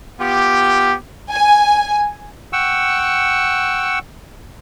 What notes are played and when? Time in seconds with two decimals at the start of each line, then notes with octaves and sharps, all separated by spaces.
0.20 B3 F4 G4
1.31 G#5
2.53 F#5 G5 C#6 E6